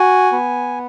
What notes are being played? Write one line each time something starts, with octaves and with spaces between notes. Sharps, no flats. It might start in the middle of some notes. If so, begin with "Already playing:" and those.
Already playing: F#4 G#5
B3